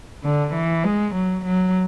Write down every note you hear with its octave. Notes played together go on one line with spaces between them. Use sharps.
D3
E3
G#3
F#3
F#3